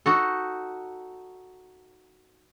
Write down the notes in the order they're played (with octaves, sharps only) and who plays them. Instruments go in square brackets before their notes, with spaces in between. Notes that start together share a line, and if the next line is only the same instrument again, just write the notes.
[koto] D#4 F#4 A4